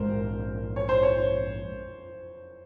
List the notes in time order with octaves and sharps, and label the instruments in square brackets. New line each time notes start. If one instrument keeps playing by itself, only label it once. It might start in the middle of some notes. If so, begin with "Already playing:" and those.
Already playing: [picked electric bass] A#1 G#2 G#3 [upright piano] A#4 C5
[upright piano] C#5
C5
C#5